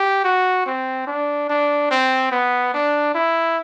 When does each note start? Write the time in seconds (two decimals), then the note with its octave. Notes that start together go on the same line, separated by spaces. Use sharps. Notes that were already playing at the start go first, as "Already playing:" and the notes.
Already playing: G4
0.24 F#4
0.66 C4
1.07 D4
1.49 D4
1.91 C4
2.32 B3
2.74 D4
3.15 E4